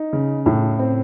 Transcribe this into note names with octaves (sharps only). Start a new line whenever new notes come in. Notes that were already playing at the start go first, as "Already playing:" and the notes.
Already playing: D#4
C#3
A2
C4